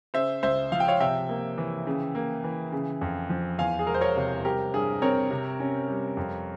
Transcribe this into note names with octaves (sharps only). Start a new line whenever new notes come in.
C#3 C5 E5
C#2 C5 E5
F3 F5
G5
C#5 F5
C3 E5 G5
A#3
E3
C#3
A#3
E3
C#3
F2
F3
E2 F5 G#5
G#4
E1 A#4
C5
A#4 C#5
C3
G3 G4 A#4
G2 G#4
C4 A#4 C#5
C3
C#4
G3
F2